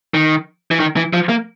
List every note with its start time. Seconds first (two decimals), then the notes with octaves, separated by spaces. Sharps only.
0.14 D#3
0.71 E3
0.80 D#3
0.96 E3
1.13 F3
1.29 A#3